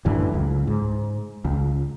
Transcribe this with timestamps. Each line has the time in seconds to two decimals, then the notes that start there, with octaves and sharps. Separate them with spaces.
0.05 A1 F#2 D3 E3
0.34 C#2
0.67 G#2
1.45 C#2